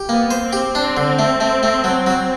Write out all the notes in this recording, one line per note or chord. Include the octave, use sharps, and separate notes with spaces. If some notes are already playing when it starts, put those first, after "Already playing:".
Already playing: G4
A#3 B3
C5
C4
G4
C4 D4
D3
A3
A3
A3
F#3
F#3